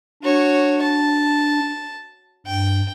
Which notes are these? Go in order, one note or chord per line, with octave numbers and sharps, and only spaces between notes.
D4 F#4 C#5
A5
G2 G5